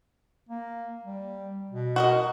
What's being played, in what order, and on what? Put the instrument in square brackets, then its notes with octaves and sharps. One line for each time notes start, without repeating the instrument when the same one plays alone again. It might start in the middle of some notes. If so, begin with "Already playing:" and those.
[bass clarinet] A#3
G3
B2
[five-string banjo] F#4 A#4 D#5